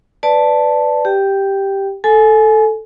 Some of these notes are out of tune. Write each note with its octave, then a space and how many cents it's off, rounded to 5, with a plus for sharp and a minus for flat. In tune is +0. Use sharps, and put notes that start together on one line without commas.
B4 +15 D5 +0 A5 +0
G4 +0 G5 +0
A4 +0 G#5 +25